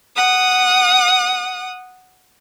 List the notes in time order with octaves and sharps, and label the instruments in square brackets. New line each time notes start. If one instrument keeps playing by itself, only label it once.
[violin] F#5 D#6